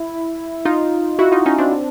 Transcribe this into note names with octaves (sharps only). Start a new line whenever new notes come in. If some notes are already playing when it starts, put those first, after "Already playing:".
Already playing: E4
D#4 F4
E4 F#4
D#4 F4
C#4 D#4
C4 D4